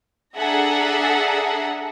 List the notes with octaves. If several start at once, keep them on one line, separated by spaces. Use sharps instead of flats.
D4 G#4 A4 E5 F#5 A#5